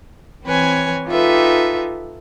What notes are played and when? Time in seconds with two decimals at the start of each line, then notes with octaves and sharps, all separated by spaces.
0.45 E3 C4 B4 C#5 G#5
1.08 D#4 F4 G4 A4 B4 E5